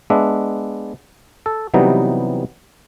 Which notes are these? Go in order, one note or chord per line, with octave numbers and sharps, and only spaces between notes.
G#3 B3 D4 E5
A4
C3 E3 F#3 G3 B3 D#4